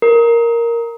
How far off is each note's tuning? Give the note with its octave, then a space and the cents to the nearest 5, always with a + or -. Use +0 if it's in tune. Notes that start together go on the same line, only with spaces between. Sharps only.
A#4 +0